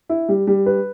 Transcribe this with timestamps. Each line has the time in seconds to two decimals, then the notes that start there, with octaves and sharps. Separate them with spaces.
0.09 E4
0.29 G3
0.47 G3
0.66 B4